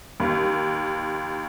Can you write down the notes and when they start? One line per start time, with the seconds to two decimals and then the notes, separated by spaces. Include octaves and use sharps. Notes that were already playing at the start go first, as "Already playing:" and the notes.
0.20 D#2